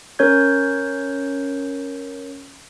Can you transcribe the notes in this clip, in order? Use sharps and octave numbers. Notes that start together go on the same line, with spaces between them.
C#4 A#4 C#5 G6 G#6